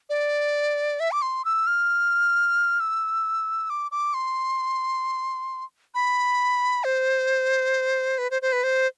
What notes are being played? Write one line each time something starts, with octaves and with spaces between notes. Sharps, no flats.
D5
E5
D6
C6
E6
F6
E6
D6
D6
C6
B5
C5
B4
C5
C5
B4
C5